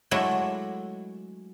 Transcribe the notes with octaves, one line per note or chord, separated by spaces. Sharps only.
F#3 G#3 A3 D4 E4